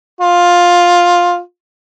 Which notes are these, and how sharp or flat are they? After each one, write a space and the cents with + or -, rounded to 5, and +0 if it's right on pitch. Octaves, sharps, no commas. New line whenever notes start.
F4 +10